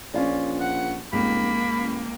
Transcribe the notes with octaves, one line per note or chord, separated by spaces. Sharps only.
A#1 C#4 F4 D5
F#5
F1 C#2 A#3 B5
A1